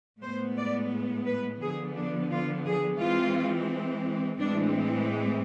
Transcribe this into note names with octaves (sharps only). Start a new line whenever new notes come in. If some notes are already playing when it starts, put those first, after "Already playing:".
A2 G#3 B3 C5
D5
B4
D3 F3 B3 G#4
D4
F4
G#4
E3 G#3 C4 F4
A2 E3 G#3 C4 D4